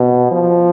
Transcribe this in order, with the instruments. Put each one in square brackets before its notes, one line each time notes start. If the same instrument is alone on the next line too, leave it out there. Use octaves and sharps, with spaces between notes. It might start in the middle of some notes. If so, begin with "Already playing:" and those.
Already playing: [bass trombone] B2
F3